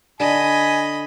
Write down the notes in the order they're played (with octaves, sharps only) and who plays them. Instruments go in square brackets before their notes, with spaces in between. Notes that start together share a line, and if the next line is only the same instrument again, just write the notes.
[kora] D3 [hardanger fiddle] D#5 B5 [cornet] G#5